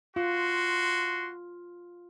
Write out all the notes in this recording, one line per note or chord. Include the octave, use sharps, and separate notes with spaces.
F4 F#4 C6